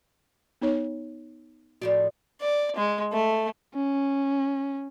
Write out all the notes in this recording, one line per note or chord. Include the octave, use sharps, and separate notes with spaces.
B3 D#4 C#5
A2 F3 F#4 D5
D5
G#3
A3
C#4